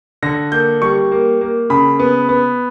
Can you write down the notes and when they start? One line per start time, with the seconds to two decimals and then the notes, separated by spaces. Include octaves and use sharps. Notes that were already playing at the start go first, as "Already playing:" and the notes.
0.23 D3 A#6
0.52 A#3 G6
0.82 G3 C#6
1.12 A#3
1.41 A#3
1.70 C#3 B5
1.99 B3
2.29 B3